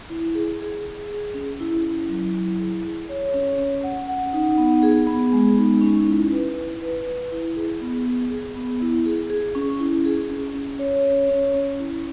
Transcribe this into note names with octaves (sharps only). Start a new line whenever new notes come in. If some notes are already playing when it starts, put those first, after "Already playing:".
E4
G#4
G#4
G#4
G#4
C#4
E4
E4
F#3
E4
G#4
G#4
C#5
C#4
C#4
F#5
F#5
D#4
B3
G#4
B3
G#3
D#4
C#4
E4
B4
E4
B4
B4
E4
G#4
B3
G#4
G#4
B3
E4
G#4
G#4
C#4
E4
G#4
C#4
C#4
C#5
C#5
C#4
C#4
E4